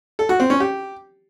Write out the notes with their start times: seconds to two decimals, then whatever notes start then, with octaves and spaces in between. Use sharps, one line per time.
0.19 A4
0.29 F#4
0.40 C4
0.50 C#4
0.60 G4